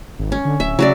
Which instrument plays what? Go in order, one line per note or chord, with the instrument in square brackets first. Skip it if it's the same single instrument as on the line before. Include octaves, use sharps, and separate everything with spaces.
[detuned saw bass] G#1
[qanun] C#4
[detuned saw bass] D3
[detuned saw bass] D1 [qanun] E5
[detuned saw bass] C#3 [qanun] F#3 F#4 D5